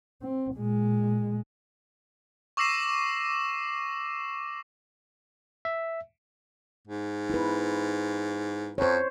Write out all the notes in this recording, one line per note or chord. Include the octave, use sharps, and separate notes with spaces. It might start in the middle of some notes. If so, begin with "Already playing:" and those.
C4
A#2 G#3
C#6 D6 E6 A#6 C7 E7
E5
G#2
E4 B4
F2 C5 C#5